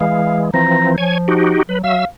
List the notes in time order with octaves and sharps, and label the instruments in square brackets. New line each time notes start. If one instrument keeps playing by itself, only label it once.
[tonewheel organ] E3 G#3 [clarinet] F5
[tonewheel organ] E3 F3 C4 [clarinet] A#5
[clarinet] F3 [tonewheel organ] C#5 G#5
[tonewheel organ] D#4 F#4 G4
[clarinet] F#3 [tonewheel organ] B4
[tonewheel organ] F#3 E5 E6 [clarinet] F5